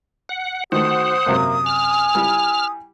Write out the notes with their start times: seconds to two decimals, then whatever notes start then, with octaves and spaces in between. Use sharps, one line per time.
0.29 F#5
0.72 D#3 A3 F#4 C5 F#5 D#6
1.27 F#2 C3 F#3 A#3
1.66 G#5 F6
2.15 G3 E4 G4